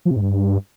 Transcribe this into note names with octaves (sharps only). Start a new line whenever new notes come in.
F3
C3
G#2
G2